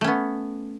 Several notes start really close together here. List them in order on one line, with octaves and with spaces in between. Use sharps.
A3 C#4 B3